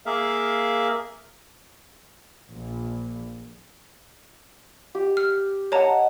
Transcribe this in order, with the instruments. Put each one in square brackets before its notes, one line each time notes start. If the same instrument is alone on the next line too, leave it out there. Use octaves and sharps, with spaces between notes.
[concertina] A#3 G#4 A#4 E5 F5
[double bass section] A#1
[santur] G4
[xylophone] F6
[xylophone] C#5 A5 A#5 [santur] D#5 F#5